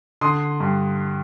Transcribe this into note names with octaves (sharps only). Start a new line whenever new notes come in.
D3 C6 D#6
G2